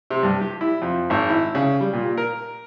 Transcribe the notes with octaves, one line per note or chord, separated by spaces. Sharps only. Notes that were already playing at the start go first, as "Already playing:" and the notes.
C3
G2
G4
E4
F2
G#1
E4
C#3
G3
A#2
A#4